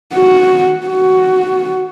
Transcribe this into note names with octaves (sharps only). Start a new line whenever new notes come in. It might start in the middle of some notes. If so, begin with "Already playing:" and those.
F#4
F#4